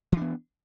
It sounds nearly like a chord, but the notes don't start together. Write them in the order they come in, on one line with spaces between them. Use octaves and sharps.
E3 D4 B3